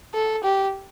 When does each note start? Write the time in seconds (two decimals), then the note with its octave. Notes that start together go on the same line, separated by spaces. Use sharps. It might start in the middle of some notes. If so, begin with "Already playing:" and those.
0.14 A4
0.44 G4